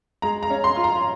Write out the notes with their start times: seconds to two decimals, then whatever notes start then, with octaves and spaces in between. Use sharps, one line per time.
0.22 G#3 A#5
0.43 A#5
0.50 C#4
0.64 C6
0.76 F4
0.84 A#5